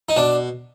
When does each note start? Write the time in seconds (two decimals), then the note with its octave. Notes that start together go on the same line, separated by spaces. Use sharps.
0.09 D#4
0.17 B2 D4